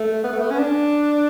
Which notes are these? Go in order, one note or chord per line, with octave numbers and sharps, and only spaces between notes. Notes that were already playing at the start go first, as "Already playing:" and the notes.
Already playing: A3
B3
A3
B3
C#4
D4